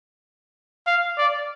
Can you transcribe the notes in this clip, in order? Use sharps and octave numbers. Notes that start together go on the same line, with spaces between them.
F5
D5